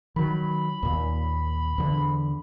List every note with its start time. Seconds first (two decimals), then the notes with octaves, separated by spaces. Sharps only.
0.16 D#3 F#3 B5
0.83 D#2 A#2
1.78 E2 D3